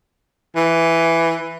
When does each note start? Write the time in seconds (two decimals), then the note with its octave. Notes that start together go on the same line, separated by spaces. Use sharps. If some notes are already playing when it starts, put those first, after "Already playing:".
0.56 E3